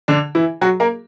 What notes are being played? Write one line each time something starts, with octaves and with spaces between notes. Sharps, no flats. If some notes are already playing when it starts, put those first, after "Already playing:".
D3 D4
E3 E4
F#3 F#4
A#3 A#4